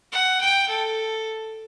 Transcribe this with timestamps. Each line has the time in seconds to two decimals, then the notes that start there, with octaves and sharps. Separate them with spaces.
0.12 F#5
0.41 G5
0.68 A4